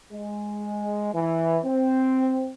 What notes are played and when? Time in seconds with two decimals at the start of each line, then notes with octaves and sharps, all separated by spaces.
0.13 G#3
1.14 E3
1.64 C4